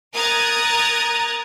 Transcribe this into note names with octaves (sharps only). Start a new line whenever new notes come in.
A#4 A#5 D#6 F#6 G#6 A6